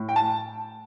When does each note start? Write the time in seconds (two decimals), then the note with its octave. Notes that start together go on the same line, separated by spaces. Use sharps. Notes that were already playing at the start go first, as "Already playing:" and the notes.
Already playing: A2
0.09 G5
0.16 A5